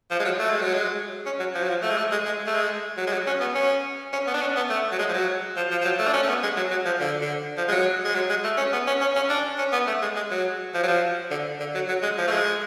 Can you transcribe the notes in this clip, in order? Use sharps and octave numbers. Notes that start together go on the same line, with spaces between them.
F3
G#3
F#3
A3
G#3
F#3
G#3
C#4
F#3
F3
F#3
F3
A3
G#3
A3
G#3
G#3
A3
G#3
F#3
G#3
F#3
C#4
B3
C#4
C#4
B3
D4
C#4
B3
A3
F#3
G#3
F3
F#3
F3
F3
F3
F#3
A3
D4
C#4
A3
B3
G#3
F#3
F#3
F3
D3
D3
F3
G#3
F#3
G#3
F#3
G#3
A3
C#4
B3
C#4
C#4
C#4
D4
C#4
B3
A3
G#3
G#3
F#3
F3
F#3
F3
D3
D3
F#3
F#3
G#3
F3
A3
G#3